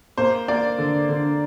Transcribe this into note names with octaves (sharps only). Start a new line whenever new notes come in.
A#3 C5
A#3 D5
D3
D3